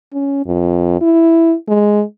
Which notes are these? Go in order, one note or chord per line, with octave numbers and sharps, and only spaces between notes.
C#4
F2
E4
G#3